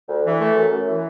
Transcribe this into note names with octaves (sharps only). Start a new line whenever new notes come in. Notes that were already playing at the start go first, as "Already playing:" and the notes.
D2
E3
A3
F#2
F#2
E3